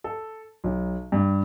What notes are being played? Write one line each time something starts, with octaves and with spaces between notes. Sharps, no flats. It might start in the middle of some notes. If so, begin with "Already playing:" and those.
A4
B1
G2